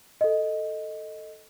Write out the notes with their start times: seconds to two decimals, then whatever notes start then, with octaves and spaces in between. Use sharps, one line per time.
0.21 A4 D#5